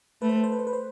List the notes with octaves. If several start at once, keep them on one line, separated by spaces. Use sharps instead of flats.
A3 B4
C5
B4
C5
B4
C5
B4
C5